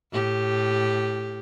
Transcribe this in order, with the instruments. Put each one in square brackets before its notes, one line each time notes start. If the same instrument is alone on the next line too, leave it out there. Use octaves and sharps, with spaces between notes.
[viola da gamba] A2 G4